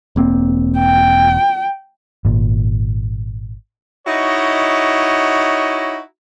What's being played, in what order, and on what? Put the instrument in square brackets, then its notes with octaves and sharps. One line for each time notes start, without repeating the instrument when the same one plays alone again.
[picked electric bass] E1 A#3 C4
[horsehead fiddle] G5
[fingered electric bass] G#1 A#2
[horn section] D#4 E4 F#4 C#5 D#5